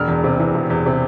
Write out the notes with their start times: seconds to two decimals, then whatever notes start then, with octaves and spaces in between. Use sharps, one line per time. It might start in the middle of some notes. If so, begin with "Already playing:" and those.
Already playing: E1 F6
0.08 E2
0.24 C3
0.39 E3
0.54 E1
0.70 E2
0.86 C3